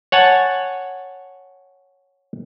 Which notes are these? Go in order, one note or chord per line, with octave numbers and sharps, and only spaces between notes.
C#5 F#5 G#5 A5